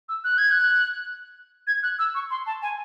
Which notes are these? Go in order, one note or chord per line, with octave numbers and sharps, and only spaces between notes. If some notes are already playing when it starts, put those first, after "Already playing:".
E6
F#6
G#6
F#6
G#6
F#6
E6
C#6
C6
A5
G#5